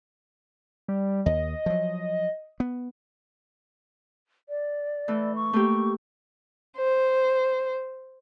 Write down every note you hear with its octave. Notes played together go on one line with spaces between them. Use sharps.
G3
D#2 D#5
F3 F#3
B3
D5
E3 A3
C#6
A3 A#3 G4
C5